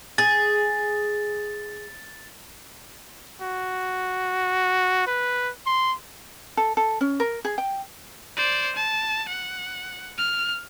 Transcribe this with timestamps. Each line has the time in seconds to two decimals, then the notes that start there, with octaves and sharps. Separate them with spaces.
0.18 G#4 A6
3.41 F#4
5.07 B4
5.66 C6
6.57 A4
6.77 A4
7.01 C#4
7.20 A#4
7.45 G#4
7.58 G5
8.37 C5 D5
8.76 A5
9.28 F#5
10.18 F6